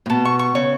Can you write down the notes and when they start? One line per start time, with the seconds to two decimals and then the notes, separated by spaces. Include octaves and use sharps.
0.06 A2
0.10 B2 A5
0.25 C#6
0.39 C#6
0.55 C#3 C#5